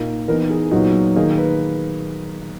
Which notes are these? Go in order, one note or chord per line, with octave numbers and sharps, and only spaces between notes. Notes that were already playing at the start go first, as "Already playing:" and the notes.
Already playing: A#2 A#3 D#4
E3 B3 D#4 A#4
G#4
A#2 F#3 B3 D#4 F#4
D#3 A#3 D#4 G#4
B4